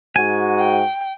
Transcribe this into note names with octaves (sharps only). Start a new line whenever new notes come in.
G#2 F#4 G#5
G5